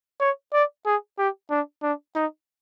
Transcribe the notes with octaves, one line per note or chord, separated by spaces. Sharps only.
C#5
D5
G#4
G4
D4
D4
D#4